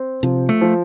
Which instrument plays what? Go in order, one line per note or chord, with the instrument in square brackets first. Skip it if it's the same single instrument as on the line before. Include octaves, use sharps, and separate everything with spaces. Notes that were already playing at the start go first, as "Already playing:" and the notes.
Already playing: [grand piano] C4
[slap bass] C3 [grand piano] F3
[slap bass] A3
[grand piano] F3